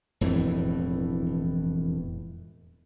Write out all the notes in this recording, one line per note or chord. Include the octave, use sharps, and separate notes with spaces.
E1 F2 A2 E3